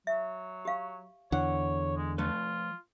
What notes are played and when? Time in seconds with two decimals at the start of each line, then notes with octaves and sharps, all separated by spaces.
0.07 F#3 E5
0.65 G4 F5
1.32 E2 D3 C#5 F#5
1.97 G#3
2.18 F3 A3 F4 B4